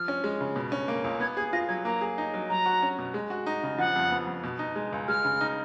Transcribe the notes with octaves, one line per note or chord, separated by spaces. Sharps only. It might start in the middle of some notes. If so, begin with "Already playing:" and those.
Already playing: F3 F6
C#4
G#3
C#3
B2
C#4
A#3
C#2
B3 G#6
G#4 G#6
F4 A#6
F#3 G#6
A#3 A#5
G#4
D#4
F#3
F#3 A#5
F#4
C#4
B2
G#3
F#4
D#4
C#3
F3 F#5
F2
B3
F2
B2
D#4
G#3
C#2
G#3 F6
C#3
D#4